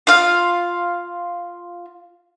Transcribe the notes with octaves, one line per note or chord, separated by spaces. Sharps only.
F4 F5